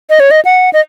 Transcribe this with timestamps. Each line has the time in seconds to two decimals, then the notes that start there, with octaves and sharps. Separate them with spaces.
0.10 D#5
0.20 C#5
0.31 D#5
0.45 F#5
0.73 D#5